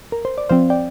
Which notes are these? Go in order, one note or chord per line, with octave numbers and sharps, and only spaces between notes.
A#4
C5
D5
F3 C4 C5 F5
D5 G5